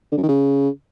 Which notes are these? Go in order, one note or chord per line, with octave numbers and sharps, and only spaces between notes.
D3
F#2
D#3
C#3